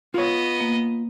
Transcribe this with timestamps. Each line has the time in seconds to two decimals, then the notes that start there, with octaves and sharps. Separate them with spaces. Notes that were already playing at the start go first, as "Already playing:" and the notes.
0.14 B3 F4 C#5 D#5
0.60 A#3